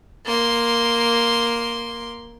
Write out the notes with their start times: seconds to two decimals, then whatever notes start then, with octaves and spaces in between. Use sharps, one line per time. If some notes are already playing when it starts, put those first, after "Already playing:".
0.26 A#3 C6